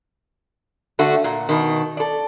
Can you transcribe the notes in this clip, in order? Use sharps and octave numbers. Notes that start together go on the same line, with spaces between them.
D3 A3 F#4
A#2
B2 D#3
A4 D5